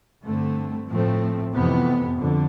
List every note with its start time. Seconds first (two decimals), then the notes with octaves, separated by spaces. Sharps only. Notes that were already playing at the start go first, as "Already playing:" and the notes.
0.24 G2 D3 A3 C4
0.88 A2 F3 A3 C4
1.53 F2 C3 E3 B3
2.18 F2 D3